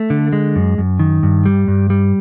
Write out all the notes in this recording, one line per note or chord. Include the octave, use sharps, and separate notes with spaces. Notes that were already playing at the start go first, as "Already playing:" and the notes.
Already playing: A3
D3
G#3
F#2
F#2
D#3
G2
G3
G2
G3